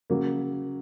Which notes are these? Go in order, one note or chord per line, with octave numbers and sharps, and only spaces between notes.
C#3 F#3 A#3